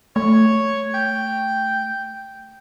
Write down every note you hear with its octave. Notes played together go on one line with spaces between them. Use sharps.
A3 C#5
G5